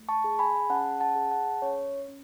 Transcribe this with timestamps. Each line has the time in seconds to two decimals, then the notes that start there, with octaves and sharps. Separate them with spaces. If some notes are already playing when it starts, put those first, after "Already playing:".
Already playing: A3
0.09 A5 C#6
0.24 G#4
0.39 G#5 B5
0.70 C#4 F#5 A5
1.00 F#5 A5
1.16 G#4
1.31 F#5 A5
1.62 C#4 C#5
2.08 C#4